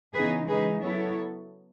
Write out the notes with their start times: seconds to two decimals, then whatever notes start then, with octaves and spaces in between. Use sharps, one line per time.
0.14 C#3 E3 B3 D#4 G#4 B4
0.48 C#3 E3 G#3 D#4 G#4 B4
0.83 F#3 B3 E4 A4 C#5